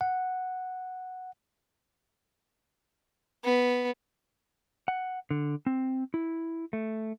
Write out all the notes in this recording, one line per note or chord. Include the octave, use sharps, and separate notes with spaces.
F#5
B3
F#5
D3
C4
E4
A3